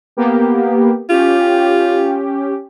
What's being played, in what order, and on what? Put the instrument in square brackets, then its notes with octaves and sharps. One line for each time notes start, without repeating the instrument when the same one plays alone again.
[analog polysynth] A#3 B3 G4
[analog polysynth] C#4 G4 [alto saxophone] F4